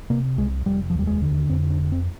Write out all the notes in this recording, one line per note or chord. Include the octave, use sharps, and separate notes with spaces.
C3 A#3
C2 G#3
F1 G3
F3
D#2 G3
G#3
D3
F2 C4
D4
F1
C4